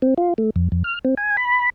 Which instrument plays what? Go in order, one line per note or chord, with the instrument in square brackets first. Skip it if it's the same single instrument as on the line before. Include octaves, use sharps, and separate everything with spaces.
[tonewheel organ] C4
F4
A3
F2
F2
F6
C4
G#5
B5